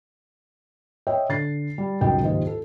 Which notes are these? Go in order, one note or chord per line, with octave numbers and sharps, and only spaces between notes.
C#5 D#5 E5 G5
D3 A6 C7
G3
D#1 C#2 F#2 D#3 D#5 G5
F#1 D#2 G#2 F4 G4 D#5
A4